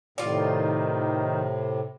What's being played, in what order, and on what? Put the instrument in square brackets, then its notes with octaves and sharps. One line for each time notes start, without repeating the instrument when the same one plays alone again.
[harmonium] A2 C3 [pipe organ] D#3 [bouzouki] F4 D5